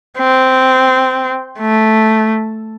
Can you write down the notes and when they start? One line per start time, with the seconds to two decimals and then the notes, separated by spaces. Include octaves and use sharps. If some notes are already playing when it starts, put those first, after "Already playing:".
0.18 C4
1.59 A3